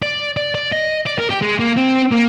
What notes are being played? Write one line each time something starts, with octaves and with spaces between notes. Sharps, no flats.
D5
D5
D5
D#5
D5
A#4
G4
G#3
A#3
C4
A#3